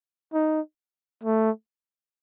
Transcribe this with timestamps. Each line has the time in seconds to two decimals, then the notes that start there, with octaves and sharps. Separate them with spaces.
0.34 D#4
1.24 A3